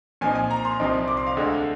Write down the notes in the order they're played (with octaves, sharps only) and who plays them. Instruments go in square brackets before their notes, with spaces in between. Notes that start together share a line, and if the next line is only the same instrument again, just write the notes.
[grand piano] A#2 F3 C4 D#4 G#5
G#5
A#5
C6
C2 C3 F3 C4 D#4
D6
C6
F5
D2 D3 G#3